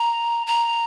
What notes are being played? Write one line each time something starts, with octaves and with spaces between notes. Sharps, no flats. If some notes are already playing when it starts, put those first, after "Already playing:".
Already playing: A#5
A#5